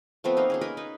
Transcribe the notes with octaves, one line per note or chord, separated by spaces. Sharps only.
F3 A3 B3 C4
A#3 D#4 D#5 F5
A#3 C#4 G#4
A#4 B4 D#5 B5
D#4 B4